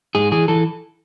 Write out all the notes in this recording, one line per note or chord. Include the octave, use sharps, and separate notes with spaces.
G#2 G#4
E3 G#4
E3 A4